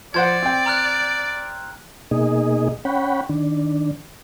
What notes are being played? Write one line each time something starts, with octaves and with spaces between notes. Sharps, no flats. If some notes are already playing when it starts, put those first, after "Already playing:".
F3 C5 D5 F#5 G#6
C4 G5
A#5 F6 F#6
B2 A#3 D#4 G#4 D#5
C#4 C#5 F#5 G5 B5
D#3 D4